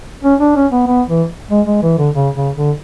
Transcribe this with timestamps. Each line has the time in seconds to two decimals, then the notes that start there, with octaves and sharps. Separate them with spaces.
0.24 C#4
0.40 D4
0.56 C#4
0.72 B3
0.88 B3
1.09 E3
1.51 G#3
1.67 G#3
1.83 E3
1.98 D3
2.15 C#3
2.36 C#3
2.57 D3